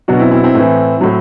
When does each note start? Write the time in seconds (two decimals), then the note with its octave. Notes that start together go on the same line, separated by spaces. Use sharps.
0.08 B2 F#3 D4 F#4
0.20 C4 E4
0.31 C4 E4
0.43 C4 E4
0.54 A2 E3
1.01 A2 F#3